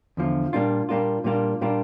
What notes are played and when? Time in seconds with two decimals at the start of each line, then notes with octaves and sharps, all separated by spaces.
0.17 E2 D3 F3
0.53 A#2 G3 A#3 D4 F4
0.89 A#2 G3 A#3 D4 F4
1.24 A#2 G3 A#3 D4 F4
1.61 A#2 G3 A#3 D4 F4